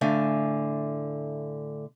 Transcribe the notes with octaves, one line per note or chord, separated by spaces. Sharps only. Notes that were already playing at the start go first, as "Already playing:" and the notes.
A2 D3 A3 F5 G#5